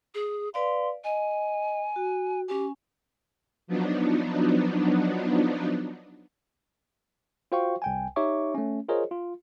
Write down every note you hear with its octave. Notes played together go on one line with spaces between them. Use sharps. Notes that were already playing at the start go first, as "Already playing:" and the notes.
G#4
B4 D5 F5 C6
D#5 G#5
F#4
C#4 G4 G#5
F3 F#3 B3 D4 D#4
F4 F#4 C5 F5 G5 C#6
C2 G5 G#5
D#4 G4 C#5 E5 C#6 D6
A3 C#4
F4 G#4 A#4 C5 C#5 D#5
F4